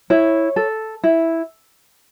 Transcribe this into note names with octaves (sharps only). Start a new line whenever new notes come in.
E4 C#5
A4
E4